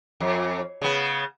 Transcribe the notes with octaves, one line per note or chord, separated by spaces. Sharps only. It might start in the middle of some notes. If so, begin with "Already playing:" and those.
F2
C#3 B3